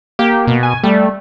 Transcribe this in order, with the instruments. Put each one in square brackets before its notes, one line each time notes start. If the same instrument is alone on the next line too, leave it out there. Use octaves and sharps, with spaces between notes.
[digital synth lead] A#3 [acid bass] G4
[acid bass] B2
[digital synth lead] G#5
[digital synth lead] G3 [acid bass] A3